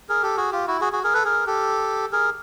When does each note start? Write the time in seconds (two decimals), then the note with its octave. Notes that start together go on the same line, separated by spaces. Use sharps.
0.09 G#4 A#4
0.23 G4 A4
0.37 F#4 G#4
0.52 F4 G4
0.67 E4 F#4
0.81 F#4 G#4
0.93 F#4 G#4
1.04 G#4 A#4
1.13 A4 B4
1.24 G#4 A#4
1.47 G4 A4
2.12 G#4 A#4